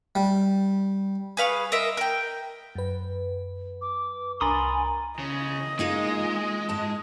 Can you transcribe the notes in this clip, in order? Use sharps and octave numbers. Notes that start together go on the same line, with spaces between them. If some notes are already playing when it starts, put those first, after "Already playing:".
G3
G#4 B4 F5 C#6
A#4 D#5 E5 C6
A#4 G5
F#2 B4
D6
C2 D4 A#4 G#5 B5 C6 D#6 A6
C#3 D#5
G#3 A#3 D#4 F4
G#2 A5